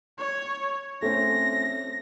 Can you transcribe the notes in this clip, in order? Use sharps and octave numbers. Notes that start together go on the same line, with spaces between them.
C#5
A3 C4 C#4 A#6